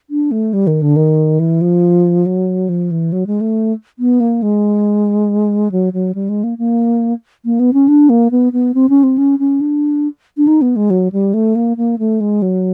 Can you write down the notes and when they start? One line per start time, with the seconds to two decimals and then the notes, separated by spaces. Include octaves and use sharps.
0.10 D4
0.31 A3
0.53 G3
0.67 D#3
0.82 D3
0.96 D#3
1.39 E3
1.61 F3
2.26 F#3
2.69 F3
2.91 E3
3.12 F#3
3.27 G#3
3.41 A3
3.99 B3
4.20 A#3
4.42 G#3
5.71 F#3
5.93 F#3
6.15 G3
6.29 G#3
6.44 A#3
6.58 A#3
7.45 A#3
7.59 B3
7.73 C#4
7.88 D4
8.09 A#3
8.31 B3
8.53 B3
8.74 C4
8.89 C#4
9.03 C4
9.18 C#4
9.39 C#4
9.61 D4
10.37 D4
10.47 D#4
10.62 B3
10.76 G#3
10.90 F#3
11.12 G3
11.34 A3
11.55 A#3
11.77 A#3
11.99 A3
12.20 G#3
12.42 F#3